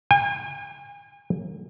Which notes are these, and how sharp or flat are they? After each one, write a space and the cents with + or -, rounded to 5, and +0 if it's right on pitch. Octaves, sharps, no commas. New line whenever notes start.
G#5 -40